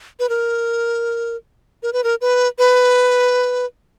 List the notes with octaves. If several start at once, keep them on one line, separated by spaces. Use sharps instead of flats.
B4
A#4
A#4
B4
A#4
B4
B4